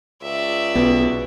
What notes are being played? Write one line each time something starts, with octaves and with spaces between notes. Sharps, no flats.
C#2 D5 E5
B1 B2 B3 C#4